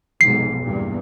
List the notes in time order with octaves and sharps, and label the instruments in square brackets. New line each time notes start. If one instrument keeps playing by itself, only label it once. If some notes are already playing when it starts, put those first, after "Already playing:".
[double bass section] F1 B1 G#2 [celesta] C7
[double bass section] E2 G2 A#2